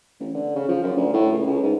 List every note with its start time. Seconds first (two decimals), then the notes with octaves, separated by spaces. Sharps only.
0.21 A1
0.35 D3
0.56 C#3
0.69 F3
0.84 F#2
0.97 D2
1.14 A2
1.33 C#2
1.47 C#2
1.63 G#2